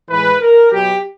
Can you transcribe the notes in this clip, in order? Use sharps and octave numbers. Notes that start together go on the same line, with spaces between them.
A2 E3 G#3 B4
A#4
B2 F#3 G4